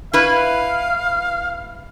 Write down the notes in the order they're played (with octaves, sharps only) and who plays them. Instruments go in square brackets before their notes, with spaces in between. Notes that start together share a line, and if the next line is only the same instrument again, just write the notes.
[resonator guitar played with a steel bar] E4 B4 [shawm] F5